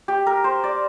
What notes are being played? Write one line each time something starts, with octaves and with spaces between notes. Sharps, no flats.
G4
A#4
C5
D5